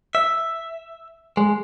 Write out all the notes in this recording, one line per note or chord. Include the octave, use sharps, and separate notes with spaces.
E5
G#3